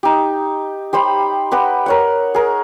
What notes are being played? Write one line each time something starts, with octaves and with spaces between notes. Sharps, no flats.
D#4 G4
G4 C5 G5 B5
G4 B4 D#5 F#5
A#4 C#5 F#5
G#4 A#4